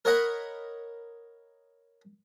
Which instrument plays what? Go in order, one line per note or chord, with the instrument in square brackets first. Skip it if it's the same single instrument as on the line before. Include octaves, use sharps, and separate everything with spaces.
[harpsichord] A#4 C#5 D#5 F#5 B5